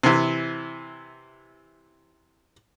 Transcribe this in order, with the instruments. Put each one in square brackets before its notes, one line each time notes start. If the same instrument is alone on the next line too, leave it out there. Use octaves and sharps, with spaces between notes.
[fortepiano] C3 E3